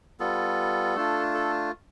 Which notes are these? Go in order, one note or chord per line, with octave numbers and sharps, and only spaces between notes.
G3 B3 F4 A4
A3 D4 F4
A4